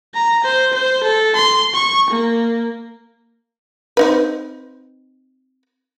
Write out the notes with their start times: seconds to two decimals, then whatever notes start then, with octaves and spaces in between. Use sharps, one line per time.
0.14 A#5
0.44 C5
0.73 C5
1.03 A4
1.35 C6
1.74 C#6
2.10 A#3
3.97 C4 D#4 B4